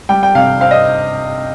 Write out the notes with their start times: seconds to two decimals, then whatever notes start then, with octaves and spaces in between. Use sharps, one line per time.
0.09 G3 G5
0.23 G5
0.35 C3 F5
0.60 C4 F5
0.71 D#5